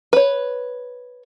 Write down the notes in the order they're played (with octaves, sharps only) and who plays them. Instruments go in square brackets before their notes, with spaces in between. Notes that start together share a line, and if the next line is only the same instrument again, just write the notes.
[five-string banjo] B4 C#5